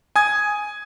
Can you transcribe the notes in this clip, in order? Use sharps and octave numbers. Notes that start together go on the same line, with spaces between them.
G#5 D#6 G#6